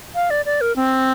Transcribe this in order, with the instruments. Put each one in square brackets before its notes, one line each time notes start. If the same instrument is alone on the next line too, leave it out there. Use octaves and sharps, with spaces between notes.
[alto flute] F5
D5
D5
A#4
C4